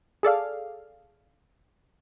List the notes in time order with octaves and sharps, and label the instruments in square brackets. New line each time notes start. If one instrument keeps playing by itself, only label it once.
[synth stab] G#4 A4 D5 F5